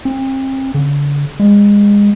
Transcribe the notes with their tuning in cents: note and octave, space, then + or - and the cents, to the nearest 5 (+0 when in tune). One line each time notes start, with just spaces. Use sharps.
C4 +35
D3 -40
G#3 -25